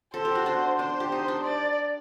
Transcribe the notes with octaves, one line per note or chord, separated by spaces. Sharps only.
A4 C5
G4
F#4
D4
D4 C5
G4
D#4
D4
D5